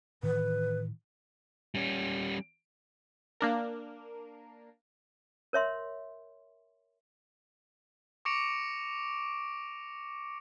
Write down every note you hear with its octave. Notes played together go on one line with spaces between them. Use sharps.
A2 D#3 E3 B4
G3 C#4
A#3 D4 A#4
A#4 C#5 E5 C6
C#6 D6 A#6 C#7 D7 F7